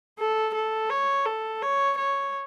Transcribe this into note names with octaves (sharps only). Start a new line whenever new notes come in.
A4
A4
C#5
A4
C#5
C#5